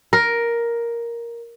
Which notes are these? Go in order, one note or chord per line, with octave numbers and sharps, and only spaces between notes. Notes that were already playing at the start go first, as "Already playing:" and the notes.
A#4